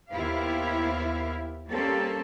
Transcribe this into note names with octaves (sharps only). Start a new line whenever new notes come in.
D#2 B3 E4 G4 C5 F5
G3 A#3 C4 C#4 G4 A4